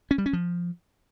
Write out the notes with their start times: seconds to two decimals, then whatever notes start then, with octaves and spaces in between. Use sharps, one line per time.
0.11 C#4
0.18 G3
0.26 C#4
0.33 F3